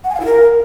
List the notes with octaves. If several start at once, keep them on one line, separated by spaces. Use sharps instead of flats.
F#5
G#5
F5
E4
A#4